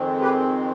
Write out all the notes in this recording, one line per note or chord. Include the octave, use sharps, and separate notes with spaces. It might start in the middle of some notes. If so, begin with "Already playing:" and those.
Already playing: F2 D#3 G#3 C4
G4 B4